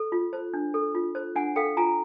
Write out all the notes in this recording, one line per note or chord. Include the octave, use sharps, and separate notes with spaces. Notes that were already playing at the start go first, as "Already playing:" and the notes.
Already playing: A4
F4
C5
D4
A4
F4
C5
D4 F#5 G#5
A4 F5 G5
F4 G#5 A#5